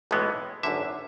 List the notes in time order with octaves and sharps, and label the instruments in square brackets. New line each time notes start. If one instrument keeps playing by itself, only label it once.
[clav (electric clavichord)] B1 A2 E3 G#3 B3
G#1 F#2 D3 E5